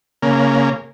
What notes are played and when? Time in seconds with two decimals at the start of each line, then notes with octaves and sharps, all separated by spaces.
0.22 C#3 A#3